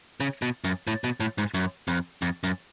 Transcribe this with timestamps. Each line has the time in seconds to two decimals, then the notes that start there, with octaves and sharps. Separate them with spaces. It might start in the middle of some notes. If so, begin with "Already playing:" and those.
0.20 C#3
0.42 B2
0.64 F#2
0.87 A2
1.04 B2
1.20 A2
1.38 G#2
1.54 F#2
1.88 F2
2.22 F2
2.44 F#2